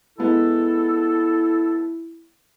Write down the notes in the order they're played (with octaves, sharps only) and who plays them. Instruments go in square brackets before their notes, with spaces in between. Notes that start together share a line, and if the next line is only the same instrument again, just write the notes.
[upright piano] G#3 B3 [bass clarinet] E4 [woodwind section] A4